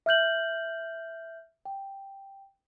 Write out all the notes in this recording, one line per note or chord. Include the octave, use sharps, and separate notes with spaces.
E5 F6 G6 F#7
G5